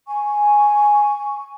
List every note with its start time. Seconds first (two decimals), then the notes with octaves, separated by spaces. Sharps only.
0.07 G#5 C#6